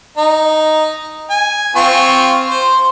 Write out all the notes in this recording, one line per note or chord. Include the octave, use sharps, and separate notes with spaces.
D#4
G#5
C4 F4 C#6
C5